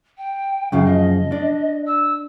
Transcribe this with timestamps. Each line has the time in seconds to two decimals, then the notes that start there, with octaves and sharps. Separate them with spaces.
0.18 G5
0.72 F#2 C#3 F3 F5
0.85 D#5
1.32 D4
1.87 E6